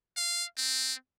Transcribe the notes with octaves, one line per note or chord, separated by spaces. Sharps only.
F5
C4